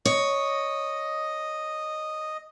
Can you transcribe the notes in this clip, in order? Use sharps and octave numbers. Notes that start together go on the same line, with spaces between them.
C#5 D#5